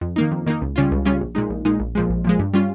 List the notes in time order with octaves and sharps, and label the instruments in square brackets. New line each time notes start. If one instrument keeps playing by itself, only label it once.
[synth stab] F2
D#3 A#3 D#4
F2
D#3 A#3 D#4
C#2
C#3 G3 C#4 F4
C#2
C#3 G3 C#4 F4
A#1
A#2 G#3 D#4
A#1
A#2 G#3 D#4
A#1
A#2 F3 G#3
A#1
A#2 F3 G#3
G2
G3 C#4 F4